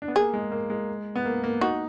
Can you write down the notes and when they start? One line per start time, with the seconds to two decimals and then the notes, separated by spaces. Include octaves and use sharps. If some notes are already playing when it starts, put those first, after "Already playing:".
0.02 D4
0.08 B3
0.16 A#3 G#4
0.33 G#3
0.52 A#3
0.70 G#3
1.16 B3
1.25 A#3
1.44 A#3
1.61 D#4 F#4